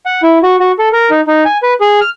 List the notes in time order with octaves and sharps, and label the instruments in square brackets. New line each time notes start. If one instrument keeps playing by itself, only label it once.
[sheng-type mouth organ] F#5
E4
F#4
F#4
A4
A#4
D#4
D#4
G#5
B4
G#4
F6